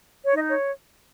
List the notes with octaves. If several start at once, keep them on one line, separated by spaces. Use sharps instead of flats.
C#5
D#4 D#5
C#5